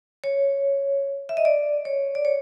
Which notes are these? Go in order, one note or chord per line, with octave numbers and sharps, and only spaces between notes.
C#5
E5
D#5
D5
C#5
D5
C#5